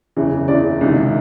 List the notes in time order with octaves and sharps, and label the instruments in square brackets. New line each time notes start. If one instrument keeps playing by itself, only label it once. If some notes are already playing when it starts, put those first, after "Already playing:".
[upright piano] F#1 E2 C#3 E3
F#1 E2 C#3 E3 D5
C#2 C3 D#3